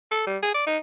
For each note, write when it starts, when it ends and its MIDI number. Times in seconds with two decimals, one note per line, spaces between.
0.11 0.24 69
0.27 0.38 55
0.43 0.52 68
0.54 0.66 74
0.66 0.78 63